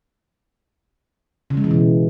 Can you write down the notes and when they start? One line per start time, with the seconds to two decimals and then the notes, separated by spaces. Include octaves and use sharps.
1.50 C#3
1.57 G#3
1.64 E3
1.71 B2